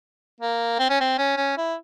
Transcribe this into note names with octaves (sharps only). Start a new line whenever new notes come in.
A#3
C4
C#4
C4
C#4
C#4
E4